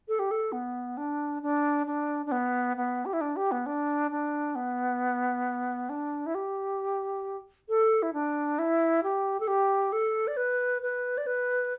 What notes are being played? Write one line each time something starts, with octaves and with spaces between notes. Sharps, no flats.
A4
G4
A4
B3
D4
D4
D4
D4
B3
B3
G4
E4
D4
G4
B3
D4
D4
B3
D4
E4
G4
A4
E4
D4
E4
G4
A4
G4
A4
D5
B4
B4
D5
B4